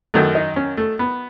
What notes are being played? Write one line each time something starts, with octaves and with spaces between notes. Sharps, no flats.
F#2 D#3 F#3 A3
D#4
C#4
A3
B3